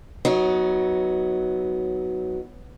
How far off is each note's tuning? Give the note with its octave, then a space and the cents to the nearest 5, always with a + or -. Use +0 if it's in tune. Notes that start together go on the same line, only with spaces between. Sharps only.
F#3 +0 B3 +0 D#4 +20